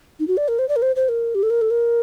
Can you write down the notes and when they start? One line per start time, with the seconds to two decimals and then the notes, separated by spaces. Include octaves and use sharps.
0.20 D#4
0.28 F#4
0.37 D5
0.48 A#4
0.59 C5
0.68 D5
0.76 A#4
0.82 C5
0.96 C5
1.09 A#4
1.35 G4
1.43 A4
1.50 A#4
1.61 A4
1.70 A#4